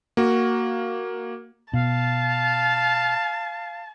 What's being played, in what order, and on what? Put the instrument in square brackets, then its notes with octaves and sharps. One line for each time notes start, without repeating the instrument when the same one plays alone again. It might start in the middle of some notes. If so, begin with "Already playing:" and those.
[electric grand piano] A#3 F#4
[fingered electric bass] B2 [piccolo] F5 [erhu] A5